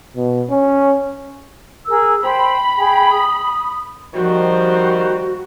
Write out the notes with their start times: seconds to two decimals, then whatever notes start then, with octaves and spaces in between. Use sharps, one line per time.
0.16 B2
0.50 C#4
1.87 G#4 A#4 E6
2.23 C5 G5 B5
2.77 G#4 G5
3.11 D#6
4.14 D#3 F3 G3 A#3 F#4 C5